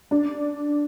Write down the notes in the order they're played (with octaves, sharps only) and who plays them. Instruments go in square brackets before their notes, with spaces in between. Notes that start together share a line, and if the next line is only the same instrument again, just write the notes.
[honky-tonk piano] D4